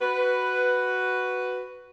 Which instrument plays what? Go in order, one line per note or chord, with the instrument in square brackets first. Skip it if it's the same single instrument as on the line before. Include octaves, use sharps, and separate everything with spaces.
[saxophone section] F#4 B4